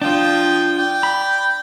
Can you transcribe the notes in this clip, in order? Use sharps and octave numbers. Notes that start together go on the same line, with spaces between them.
F3 D4 F4 G5 D#6
D5 G5
B5